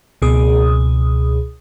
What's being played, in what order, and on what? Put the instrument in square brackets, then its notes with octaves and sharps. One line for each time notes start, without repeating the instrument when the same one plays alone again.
[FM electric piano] C#2 B2 G#4 D#6